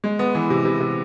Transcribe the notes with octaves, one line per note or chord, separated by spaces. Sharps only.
G#3
B3
E3
C3
C3
C3